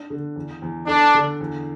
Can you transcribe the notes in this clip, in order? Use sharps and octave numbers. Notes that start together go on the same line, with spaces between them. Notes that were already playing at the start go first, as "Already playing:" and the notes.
Already playing: D4
D3
E2
E2
D4 A4
D3
E2